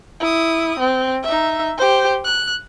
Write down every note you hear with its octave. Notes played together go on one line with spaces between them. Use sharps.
E4 D#6
C4
D#4 E5
G4 C5
F#6